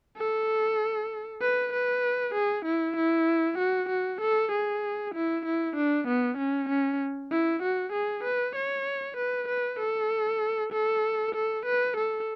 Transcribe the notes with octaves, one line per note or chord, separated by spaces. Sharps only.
A4
B4
B4
G#4
E4
E4
F#4
F#4
A4
G#4
E4
E4
D4
B3
C#4
C#4
E4
F#4
G#4
B4
C#5
B4
B4
A4
A4
A4
B4
A4